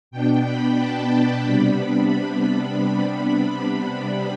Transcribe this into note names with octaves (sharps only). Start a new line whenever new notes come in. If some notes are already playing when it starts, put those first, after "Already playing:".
B2 B3 D4 G5
B5
A5
C3 G3 B3 D4 B5